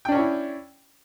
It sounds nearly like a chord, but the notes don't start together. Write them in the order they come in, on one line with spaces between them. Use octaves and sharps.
G5 D4 C#4 C#5 E4